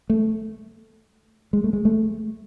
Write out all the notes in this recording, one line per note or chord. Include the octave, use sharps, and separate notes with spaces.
A3
G#3
A3
G#3
A3